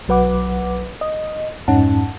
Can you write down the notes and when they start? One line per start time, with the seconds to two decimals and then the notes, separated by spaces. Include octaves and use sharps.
0.08 B1 F#3 B4 F#5 D6
1.01 D#5
1.68 F2 G#2 C#4 D#4 F#5 A5